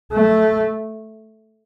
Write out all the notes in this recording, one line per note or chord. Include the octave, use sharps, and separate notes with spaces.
A3